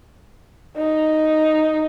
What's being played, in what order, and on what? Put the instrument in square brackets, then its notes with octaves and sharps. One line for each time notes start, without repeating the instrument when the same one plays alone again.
[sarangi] D#4